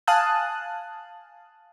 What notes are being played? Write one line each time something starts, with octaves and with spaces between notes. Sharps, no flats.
F5 G#5 A5 D#6 F#6